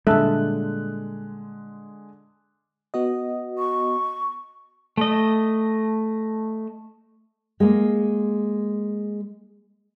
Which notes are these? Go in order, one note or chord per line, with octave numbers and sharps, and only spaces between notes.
A#2 D3 G3 G#3 A4 E5 F#6
B3 F#4 D#5
C#6
A3 D#5
G#3 A#3